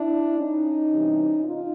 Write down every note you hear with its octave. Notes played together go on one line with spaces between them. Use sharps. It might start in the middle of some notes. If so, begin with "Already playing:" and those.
Already playing: D4 E4
C#4 D#4
C3 E3 G3
D#4 F4